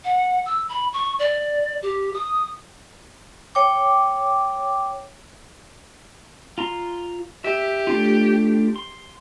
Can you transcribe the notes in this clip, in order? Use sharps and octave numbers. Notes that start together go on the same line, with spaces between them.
F#5
E6
B5
C#6
D5
G4
D#6
C#5 G5 D6
F4 A#5 C6
G4 E5
A3 D4 F4
C6